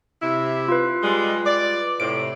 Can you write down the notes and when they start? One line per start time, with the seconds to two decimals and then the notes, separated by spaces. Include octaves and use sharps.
0.22 C3 E4
0.68 F4 B4
1.03 G3 G#3
1.46 D5
2.00 A2 C3 D7